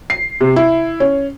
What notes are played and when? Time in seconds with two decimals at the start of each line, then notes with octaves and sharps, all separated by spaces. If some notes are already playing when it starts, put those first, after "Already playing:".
0.10 C7
0.41 C3
0.56 E4
1.00 C#4